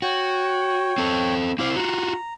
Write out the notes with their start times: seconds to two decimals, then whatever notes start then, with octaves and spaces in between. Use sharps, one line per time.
0.02 F#4 C#5 G5
0.98 C4 A4
1.59 C4 E4 C5 F5 D6
1.76 F4 F#4 A#5